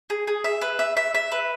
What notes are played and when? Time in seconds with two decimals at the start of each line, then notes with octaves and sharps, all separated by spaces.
0.10 G#4
0.27 G#4
0.44 E5
0.61 B4
0.79 E5
0.97 E5
1.15 E5
1.32 B4